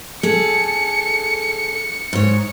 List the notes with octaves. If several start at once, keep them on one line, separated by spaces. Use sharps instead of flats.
G#4 A4 C#7
G#2 C#5